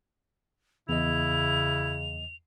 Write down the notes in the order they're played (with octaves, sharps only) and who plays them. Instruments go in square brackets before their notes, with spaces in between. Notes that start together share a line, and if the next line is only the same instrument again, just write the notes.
[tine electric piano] E2 D#5 [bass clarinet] C#3 [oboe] E4 [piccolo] F7